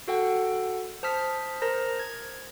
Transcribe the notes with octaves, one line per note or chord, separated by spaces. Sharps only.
F#4 A4 F#5 G5
C5 A5 D#6 F6 B6
A#4 C5 A#5 A#6
G#6